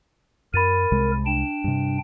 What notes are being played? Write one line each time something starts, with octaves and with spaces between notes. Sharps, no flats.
F#2 A#4 B5 A6 D#7
C2 C3 G#3
D4 G5 E7
G2 C3